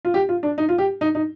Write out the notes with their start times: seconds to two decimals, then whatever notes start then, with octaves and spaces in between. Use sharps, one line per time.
0.05 F4
0.14 G4
0.29 F4
0.43 D4
0.58 D#4
0.69 F4
0.78 G4
1.01 D#4
1.15 D#4